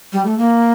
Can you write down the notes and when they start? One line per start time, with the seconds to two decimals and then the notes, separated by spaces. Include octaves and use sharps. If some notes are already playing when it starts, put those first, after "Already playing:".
0.13 G3
0.25 A3
0.38 A#3